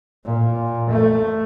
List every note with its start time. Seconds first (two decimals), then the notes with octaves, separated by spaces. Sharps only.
0.25 A#2
0.90 A3